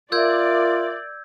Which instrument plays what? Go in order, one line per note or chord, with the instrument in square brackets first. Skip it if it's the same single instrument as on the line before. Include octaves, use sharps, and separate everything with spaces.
[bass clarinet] F4 [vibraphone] A#4 E5 [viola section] D5 [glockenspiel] E6 G6 G#6